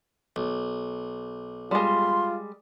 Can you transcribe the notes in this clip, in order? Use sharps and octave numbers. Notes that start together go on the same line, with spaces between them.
B1
G3 G#3 F4 C6